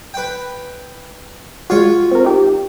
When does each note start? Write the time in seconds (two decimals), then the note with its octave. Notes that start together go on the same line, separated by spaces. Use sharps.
0.14 B4 G5
1.70 G#3 F4 F#4 C#5
2.11 C4 A#4
2.25 D#4 G4